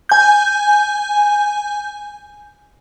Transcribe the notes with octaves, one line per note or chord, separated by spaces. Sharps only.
G#5 G6